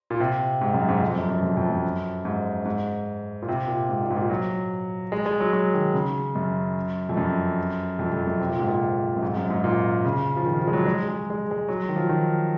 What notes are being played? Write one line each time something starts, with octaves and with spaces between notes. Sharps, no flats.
A#2
C3
G#2
F#2
G#2
F2
F#2
F#2
F2
F2
F#2
G#2
G#2
A#2
C3
A#2
G#2
A#2
G#2
A#2
F#3
G#3
G#3
F#3
F#3
D#3
C#3
F#2
F2
F#2
F2
F2
F#2
C3
A#2
G#2
A#2
F#2
G#2
F#2
G#2
A#2
C#3
F3
D#3
F3
G#3
F#3
G#3
G#3
G#3
G#3
F#3
D#3
F3
D#3